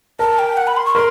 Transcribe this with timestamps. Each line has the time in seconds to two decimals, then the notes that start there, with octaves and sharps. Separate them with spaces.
0.19 A#4 A5
0.39 G5
0.57 F#5
0.67 B5
0.77 C6
0.85 C#6
0.95 A#4 C6